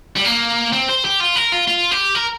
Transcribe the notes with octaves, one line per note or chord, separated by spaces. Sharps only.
G3
A#3
C4
C5
G4
F4
A#4
F4
F4
G4
A#4